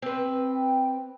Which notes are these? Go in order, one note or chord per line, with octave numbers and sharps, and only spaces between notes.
C4 B4
G5